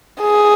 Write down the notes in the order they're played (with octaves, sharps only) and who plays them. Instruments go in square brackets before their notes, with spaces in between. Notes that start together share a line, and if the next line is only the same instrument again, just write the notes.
[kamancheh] G#4